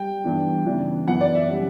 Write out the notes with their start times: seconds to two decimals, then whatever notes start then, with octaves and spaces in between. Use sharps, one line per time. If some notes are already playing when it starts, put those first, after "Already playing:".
Already playing: G3 G5
0.24 G2 E3 G3 B3 D4
0.65 C#3 E3 B3 D4
1.07 F#2 E3 B3 E4 F#5
1.21 D5
1.35 E5
1.48 C#3 G3 C#4